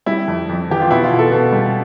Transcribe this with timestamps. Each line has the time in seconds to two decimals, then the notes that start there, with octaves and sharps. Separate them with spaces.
0.06 G3 E4
0.28 F2
0.49 F2
0.70 E3 G4
0.81 F4
0.90 B2 E4
1.04 F4
1.12 B2
1.19 A4
1.32 B2
1.52 G3